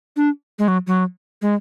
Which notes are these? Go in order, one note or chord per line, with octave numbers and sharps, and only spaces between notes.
D4
G#3
F#3
F#3
G#3